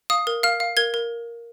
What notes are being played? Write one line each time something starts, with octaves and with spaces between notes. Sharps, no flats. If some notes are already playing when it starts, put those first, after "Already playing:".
F5 D#6
A#4
F5 F6
F5
A#4 G#6
A#4